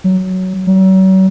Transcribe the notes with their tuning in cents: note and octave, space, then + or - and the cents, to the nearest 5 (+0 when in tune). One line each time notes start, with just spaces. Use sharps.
F#3 +10
F#3 +40